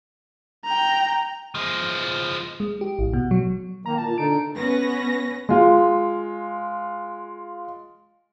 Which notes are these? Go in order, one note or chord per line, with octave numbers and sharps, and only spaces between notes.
G5 A#5
F3 G#3
G#3
G4
A1
B2
F#3
D#3 A#3 A#5
A#2 A5
D3 D#4 D7
B3 C#4 B4 A#6
G#3 F4